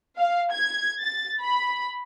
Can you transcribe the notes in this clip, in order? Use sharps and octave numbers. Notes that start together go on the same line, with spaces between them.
F5
G#6
A6
B5